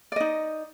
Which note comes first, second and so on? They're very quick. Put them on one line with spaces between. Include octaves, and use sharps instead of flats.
D5 D#5 D#4